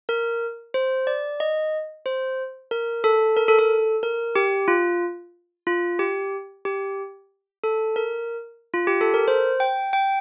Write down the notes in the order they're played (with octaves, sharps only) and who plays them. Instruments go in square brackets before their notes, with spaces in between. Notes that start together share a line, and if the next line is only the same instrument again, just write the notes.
[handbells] A#4
C5
D5
D#5
C5
A#4
A4
A#4
A4
A4
A#4
G4
F4
F4
G4
G4
A4
A#4
F4
G4
A4
A#4
C5
G5
G5